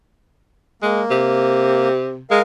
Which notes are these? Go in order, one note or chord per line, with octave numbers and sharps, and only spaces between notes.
G#3 A#3
C3
G#3 A#4 F5